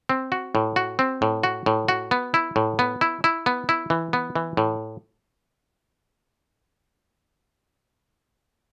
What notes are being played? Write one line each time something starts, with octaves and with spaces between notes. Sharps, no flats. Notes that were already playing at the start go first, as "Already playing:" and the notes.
C4
F#4
A2
F#4
C4
A2
F#4
A2
F#4
B3
E4
A2
B3
E4
E4
B3
E4
E3
B3
E3
A2